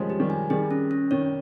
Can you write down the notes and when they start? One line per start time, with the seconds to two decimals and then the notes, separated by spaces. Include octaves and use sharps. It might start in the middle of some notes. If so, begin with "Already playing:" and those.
Already playing: D#3 F3 G3 G#3 C#4
0.10 G4
0.20 D#3 G3
0.30 G#5
0.50 D#3 G3 G#4
0.71 C#4
0.91 C#4
1.11 D#3 C#5